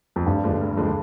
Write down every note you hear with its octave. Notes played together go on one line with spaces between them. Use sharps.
F2
F1 G2
D#2 D3 F3 G#3
F1
D#2 D3 F3 G#3